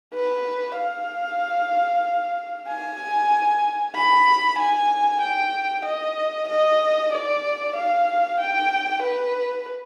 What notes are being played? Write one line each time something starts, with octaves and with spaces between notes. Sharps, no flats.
B4
F5
G#5
B5
G#5
G5
D#5
D#5
D5
F5
G5
B4